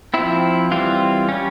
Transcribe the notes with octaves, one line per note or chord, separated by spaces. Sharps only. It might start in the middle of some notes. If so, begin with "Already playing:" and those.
F3 C4 E4
E3 G3 C4 F4
G3 C#4